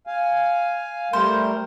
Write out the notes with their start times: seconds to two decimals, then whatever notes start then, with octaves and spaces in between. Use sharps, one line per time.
0.07 F5 G#5
1.13 G3 A3 A#4 C5